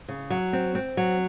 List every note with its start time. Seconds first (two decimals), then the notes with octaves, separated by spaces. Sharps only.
0.08 C#3
0.30 F#3
0.53 C4
0.75 C4
0.97 F#3